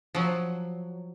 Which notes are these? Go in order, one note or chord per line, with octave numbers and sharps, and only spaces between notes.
F3 F#3